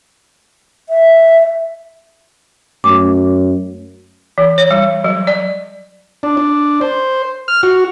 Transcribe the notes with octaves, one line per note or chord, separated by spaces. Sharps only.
E5
F#2 A3 D6
E3
C#5
G3
F#3
D5
D4
D4
C5
F6
F#4